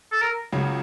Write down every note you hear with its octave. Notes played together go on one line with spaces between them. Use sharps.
A4
A#4
C#2 C#3 F#3